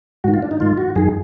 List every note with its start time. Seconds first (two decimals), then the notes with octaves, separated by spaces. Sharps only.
0.24 G#2 D#3 F#4
0.34 F4
0.42 D4
0.51 D#4
0.60 G#2 D#3 F4
0.78 F#4
0.96 F#2 D#3 G#4